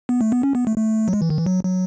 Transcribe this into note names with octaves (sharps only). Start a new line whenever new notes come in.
B3
A3
B3
C#4
B3
A3
A3
F#3
G#3
E3
D#3
E3
F#3
F#3